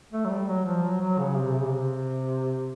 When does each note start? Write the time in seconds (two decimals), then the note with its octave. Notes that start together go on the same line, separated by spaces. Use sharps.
0.13 A3
0.25 F#3
0.29 G3
0.48 F#3
0.65 F3
0.83 F#3
1.01 F#3
1.18 C#3
1.37 C3
1.53 C3
1.61 C#3
1.69 C3